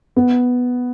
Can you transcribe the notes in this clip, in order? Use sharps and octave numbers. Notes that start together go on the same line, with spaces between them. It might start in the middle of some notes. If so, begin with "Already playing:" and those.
B3